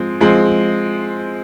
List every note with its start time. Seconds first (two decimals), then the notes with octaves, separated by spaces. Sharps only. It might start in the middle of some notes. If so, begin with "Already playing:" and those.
Already playing: F3 G#3 C4
0.20 F3 G#3 C4